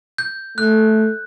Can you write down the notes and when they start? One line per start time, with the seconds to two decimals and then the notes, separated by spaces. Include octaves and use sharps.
0.18 G6
0.58 A3 F#6